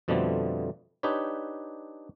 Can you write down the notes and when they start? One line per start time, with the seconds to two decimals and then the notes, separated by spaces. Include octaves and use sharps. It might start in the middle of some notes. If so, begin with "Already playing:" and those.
0.08 F2 B2 D3 F3 G3 A3
1.03 D4 D#4 G4 B4 C#5